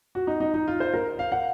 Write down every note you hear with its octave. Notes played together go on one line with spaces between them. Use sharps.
F#4
D#4
D#4
D#4
F4
C5
A#4
F5
F#5